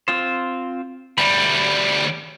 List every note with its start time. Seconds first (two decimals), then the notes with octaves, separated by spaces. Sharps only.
0.08 C4 F4 C5
1.18 D2 G3 B5